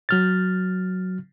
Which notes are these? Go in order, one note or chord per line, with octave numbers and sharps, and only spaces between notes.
F#3 F6 A6